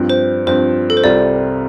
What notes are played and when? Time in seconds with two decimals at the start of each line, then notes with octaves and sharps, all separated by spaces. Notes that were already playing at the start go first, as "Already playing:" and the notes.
Already playing: G2 F3 C4 F4
0.10 C5
0.47 G2 F3 C4 F4 C5
0.90 A4
0.97 C5
1.03 C2 C3 G3 F4 D5